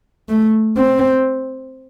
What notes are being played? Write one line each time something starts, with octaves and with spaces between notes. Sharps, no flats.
A3
C4